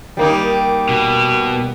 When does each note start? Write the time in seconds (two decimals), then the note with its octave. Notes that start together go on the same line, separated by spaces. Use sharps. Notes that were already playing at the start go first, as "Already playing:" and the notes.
0.17 G3 A#3 D#4
0.89 B2